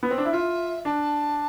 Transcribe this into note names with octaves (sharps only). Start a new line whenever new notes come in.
B3
C4
D4
E4
F4 E5
D4 A5